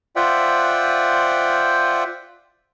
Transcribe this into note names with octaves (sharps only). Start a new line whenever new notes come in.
F4 C5 D5 E5 F#5 G5